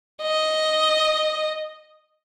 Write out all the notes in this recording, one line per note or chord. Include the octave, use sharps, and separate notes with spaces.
D#5